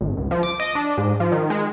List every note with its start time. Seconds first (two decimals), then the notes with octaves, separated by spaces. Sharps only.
0.01 G#1
0.17 C#2
0.31 F3
0.43 D6
0.60 D#5
0.75 D4
0.97 G#2
1.20 F3
1.32 D#3
1.50 G#3